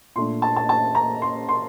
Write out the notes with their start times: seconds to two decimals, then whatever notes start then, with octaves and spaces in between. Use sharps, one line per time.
0.16 A#2 A3 D4 C6
0.42 A5
0.56 A5
0.69 A5
0.95 A#5
1.22 C6
1.49 C6